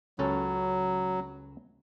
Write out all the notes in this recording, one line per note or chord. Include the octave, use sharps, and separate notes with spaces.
C#2 F#3 C#4 A4